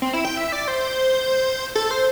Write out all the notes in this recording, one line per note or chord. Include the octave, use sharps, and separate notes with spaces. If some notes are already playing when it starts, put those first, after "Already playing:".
C4
E4
G5
E5
D5
C5
A4
C5